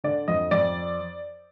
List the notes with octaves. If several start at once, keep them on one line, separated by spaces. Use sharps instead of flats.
D3 D5
F2 D#5
F2 D5